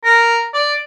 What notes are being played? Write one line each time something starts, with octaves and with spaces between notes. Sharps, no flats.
A#4
D5